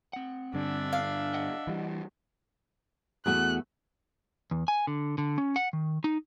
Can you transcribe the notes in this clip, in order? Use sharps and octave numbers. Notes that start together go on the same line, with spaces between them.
C4 F#5
G2 D3 D4 E5
F5
D#5 F#5
E3 G3
E2 A3 F#4 F#6
E2
G#5
D3
D3
C#4
F#5
D#3
D#4